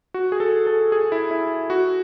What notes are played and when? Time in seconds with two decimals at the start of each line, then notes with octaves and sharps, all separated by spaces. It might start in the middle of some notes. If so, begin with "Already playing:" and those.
0.14 F#4
0.32 G#4
0.40 A4
0.67 A4
0.92 G#4
1.12 E4
1.31 E4
1.70 F#4